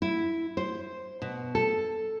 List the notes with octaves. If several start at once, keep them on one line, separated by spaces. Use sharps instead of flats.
E4
C5
B2
A4